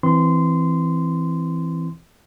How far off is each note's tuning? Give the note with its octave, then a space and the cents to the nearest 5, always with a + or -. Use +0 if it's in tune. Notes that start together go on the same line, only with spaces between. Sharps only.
E3 +0 C4 +0 C6 -20